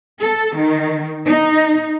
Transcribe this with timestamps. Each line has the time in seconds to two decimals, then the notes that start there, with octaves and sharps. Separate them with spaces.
0.21 A4
0.56 D#3
1.25 D#4